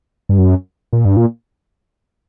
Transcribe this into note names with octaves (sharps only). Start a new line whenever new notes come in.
G2
F#2
A#2
G2
A#2